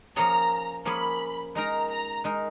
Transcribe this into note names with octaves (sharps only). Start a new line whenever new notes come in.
F3 A#3 C#4 G#4 C#5 A#5
F3 A#3 C#4 G#4 C#5 B5
G#3 D#4 A#4 A#5
A#5
G#3 D#4 A#4